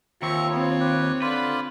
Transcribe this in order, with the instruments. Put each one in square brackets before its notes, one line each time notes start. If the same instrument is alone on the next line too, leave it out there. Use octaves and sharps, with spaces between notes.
[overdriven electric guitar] D#2 [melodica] C4 E5 A#5 [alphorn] F4 [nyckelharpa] C#6
[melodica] B3 [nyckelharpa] C4 C#5
[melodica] G4 B4
[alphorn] D3 [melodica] F4 C5 D5 [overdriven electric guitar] B4